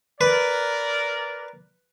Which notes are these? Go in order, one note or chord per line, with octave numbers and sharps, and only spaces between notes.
A#4 B4 D5